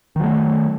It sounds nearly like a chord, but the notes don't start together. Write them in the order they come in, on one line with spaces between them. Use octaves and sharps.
D#3 F#3 A3